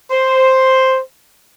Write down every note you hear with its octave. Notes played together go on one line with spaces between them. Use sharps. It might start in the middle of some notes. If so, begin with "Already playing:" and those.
C5